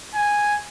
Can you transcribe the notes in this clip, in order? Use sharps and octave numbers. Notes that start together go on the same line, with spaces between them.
G#5